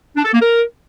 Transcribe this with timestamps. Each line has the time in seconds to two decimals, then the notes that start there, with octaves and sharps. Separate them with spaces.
0.17 D4
0.25 A4
0.33 A#3
0.42 A#4